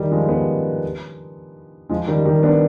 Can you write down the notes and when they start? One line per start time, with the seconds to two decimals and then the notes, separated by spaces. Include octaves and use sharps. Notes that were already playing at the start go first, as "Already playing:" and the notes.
Already playing: D#3 G3
0.11 F3 G#3
0.29 G3 B3
1.89 F3 G#3
2.07 D#3 G3
2.25 D#3 G3
2.43 B3 D4